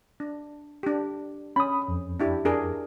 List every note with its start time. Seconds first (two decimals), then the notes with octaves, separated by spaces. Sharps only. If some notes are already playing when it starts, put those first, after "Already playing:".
0.20 D4
0.83 D4 G4
1.56 C#4 B5 D#6
1.88 F2
2.20 D4 E4 G4
2.45 D4 G#4 A#4